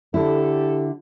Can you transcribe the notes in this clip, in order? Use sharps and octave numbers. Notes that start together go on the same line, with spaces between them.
D3 E4 G4 A4